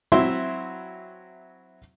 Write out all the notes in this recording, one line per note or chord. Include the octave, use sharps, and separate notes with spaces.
F#3 C4 E4 E5 C6